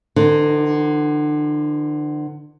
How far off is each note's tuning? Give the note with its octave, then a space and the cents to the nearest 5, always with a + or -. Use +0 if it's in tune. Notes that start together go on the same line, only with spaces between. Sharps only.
D3 +35 F3 -45 D#4 +0